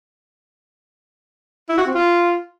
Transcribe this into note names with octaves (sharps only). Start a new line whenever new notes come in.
E4
F#4
C4
F4